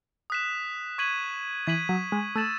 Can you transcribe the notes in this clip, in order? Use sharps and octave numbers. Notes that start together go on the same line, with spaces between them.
D#6 F#6 B6 E7
C#6 G#6 B6 D#7 F#7
E3 G#6 B6 D#7 F#7
F#3
G#3
A3 E6 A6 E7